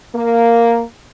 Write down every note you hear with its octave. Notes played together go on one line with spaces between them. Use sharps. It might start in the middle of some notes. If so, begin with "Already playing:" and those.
A#3